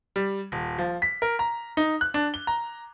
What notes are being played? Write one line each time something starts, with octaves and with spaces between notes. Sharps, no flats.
G3
D#1
F3
B6
A#4
A#5
D#4
F#6
D4
G7
A#5